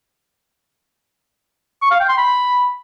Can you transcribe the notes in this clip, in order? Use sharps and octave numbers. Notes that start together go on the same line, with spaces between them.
C#6
F5
G5
C6
B5